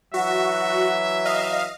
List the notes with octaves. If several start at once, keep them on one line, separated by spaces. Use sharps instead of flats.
E3 F#3 F#4 E5
D#5 F5